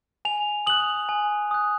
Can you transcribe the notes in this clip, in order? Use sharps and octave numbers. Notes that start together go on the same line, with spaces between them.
G#5 F7
D#6 F#6 F#7
G#5
D#6 F#6